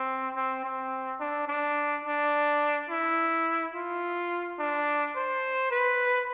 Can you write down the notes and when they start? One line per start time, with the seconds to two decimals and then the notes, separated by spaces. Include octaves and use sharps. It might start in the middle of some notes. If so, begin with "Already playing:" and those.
Already playing: C4
0.36 C4
0.64 C4
1.20 D4
1.48 D4
2.05 D4
2.90 E4
3.74 F4
4.59 D4
5.16 C5
5.71 B4